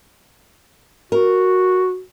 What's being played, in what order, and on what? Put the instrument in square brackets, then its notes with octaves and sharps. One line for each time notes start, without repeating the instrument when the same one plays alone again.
[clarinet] F#4 [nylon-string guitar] A#4